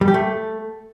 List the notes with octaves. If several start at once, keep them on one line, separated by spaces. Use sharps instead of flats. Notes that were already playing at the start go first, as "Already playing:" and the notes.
G3
G4
A3